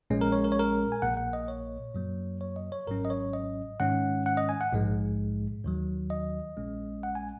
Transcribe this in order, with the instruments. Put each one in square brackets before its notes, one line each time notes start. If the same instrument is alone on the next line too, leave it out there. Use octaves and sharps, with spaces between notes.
[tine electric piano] A#1 A#2 G#3 C#4
A#4
C#5
A#4
C#5
A#4
G#5
A#1 A#2 A#3 F#5
F#5
D#5
C#5
F#2 F#3 A#3
C#5
D#5
C#5
G#1 G#2 F#3 C#4 A#4
D#5
C#5
D#5
G#2 D#3 G#3 C#4 F#5
F#5
D#5
G#5
F#5
A#1 G#2 G#3
D#2 D#3 F#3
D#5
A#1 A#2 G#3 C#4
F#5
G#5